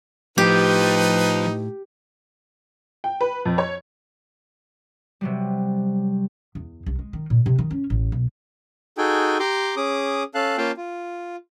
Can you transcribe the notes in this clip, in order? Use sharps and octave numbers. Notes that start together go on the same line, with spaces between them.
A2 F3 D#4 G4 B4
G5
B4
F2
C#5
C3 F#3 G3
E2
C2
G#3
D#3
A#2
C3
D#3
C#4
A1
B1
D#4 F#4 G#4 A4 G5 G#5
G4 A#5 C6 D6
C#4 G#4 D6 D#6
C#4 A4 F5 A5 F#6
A#3 C#4 F4 F5 G5 A5
F4